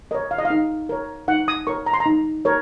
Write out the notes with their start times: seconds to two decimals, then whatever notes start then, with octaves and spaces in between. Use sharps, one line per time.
0.11 A#4 C#5 D#5
0.31 F5
0.38 D#5
0.45 F5
0.50 D#4
0.89 A#4 C#5
1.28 D#4 F#5
1.48 D#6
1.67 A#4 C#5 C#6
1.86 A#5
1.93 C6
2.00 A#5
2.06 D#4
2.45 A#4 C#5